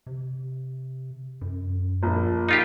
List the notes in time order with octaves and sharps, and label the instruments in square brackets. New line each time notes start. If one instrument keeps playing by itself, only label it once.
[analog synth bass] C3
F#2
[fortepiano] A#1
[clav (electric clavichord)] D#4 F4 G4